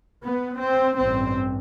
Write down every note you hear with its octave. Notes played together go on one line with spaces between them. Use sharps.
B3
C4
A1 G2 C4